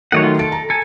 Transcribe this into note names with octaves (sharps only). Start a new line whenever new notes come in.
D#3 F#3 A3 C#5 D#5 F#5
F4
A4 D7
A#5
A4 G#5